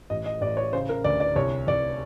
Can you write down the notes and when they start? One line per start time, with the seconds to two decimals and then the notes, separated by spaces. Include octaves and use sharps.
0.10 A1 D#5
0.26 D#5
0.41 A1 D5
0.57 C#5
0.73 C#3 C5
0.89 A#4
1.04 D2 D5
1.20 D5
1.36 C2 C#5
1.68 C2 D5